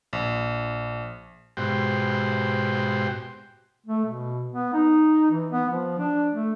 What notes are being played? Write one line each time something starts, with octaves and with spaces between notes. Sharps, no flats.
A#1
G#2 B2 F#4 G4 C5 G5
A3
B2
B3
D#4
E3
B3
F3
D4
A3